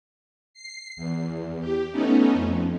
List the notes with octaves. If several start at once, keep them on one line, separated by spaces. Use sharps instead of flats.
C7
E2
G4
A3 B3 C#4 D#4
F2